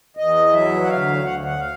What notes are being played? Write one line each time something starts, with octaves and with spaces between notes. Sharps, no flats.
E2 D#5
F#3 E5
F#5
D2 F5
D2 F#5
F#5
F5